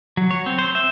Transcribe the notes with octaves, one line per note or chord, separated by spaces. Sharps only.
F#3
C#5
C4
C5
E5